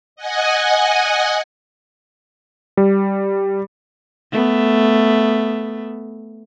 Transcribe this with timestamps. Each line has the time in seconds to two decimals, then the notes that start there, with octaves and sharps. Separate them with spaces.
0.16 D#5 F#5 G#5
2.77 G3
4.32 A3 B3